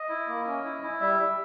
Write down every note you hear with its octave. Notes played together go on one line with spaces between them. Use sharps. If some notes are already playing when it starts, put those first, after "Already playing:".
Already playing: D#5
E4
A#3
C#4
E4
E4
G3 E5
G3